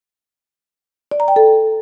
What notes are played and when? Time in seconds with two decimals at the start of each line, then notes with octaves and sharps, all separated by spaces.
1.11 D5
1.20 A#5
1.28 G5
1.36 A4